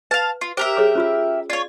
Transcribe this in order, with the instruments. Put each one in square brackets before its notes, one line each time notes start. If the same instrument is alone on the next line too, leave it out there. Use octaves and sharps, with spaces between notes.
[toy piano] B4 [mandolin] F5 A5
[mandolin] F4
[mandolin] G4 A#4 E5 [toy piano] C5
[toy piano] G#4 C#5 D6
C#4 F4 E6
[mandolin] F4 C#5 [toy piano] D5